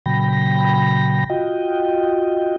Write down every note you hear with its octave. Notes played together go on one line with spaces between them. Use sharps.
A#2 C#3 F#3 G5 B5 A#6
F4 F#4 D#5 G5